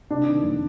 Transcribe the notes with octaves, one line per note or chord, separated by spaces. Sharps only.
C3 D4
D#3
F2